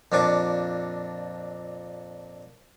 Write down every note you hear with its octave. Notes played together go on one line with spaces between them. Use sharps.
F2 A#2 D4 C#6 D6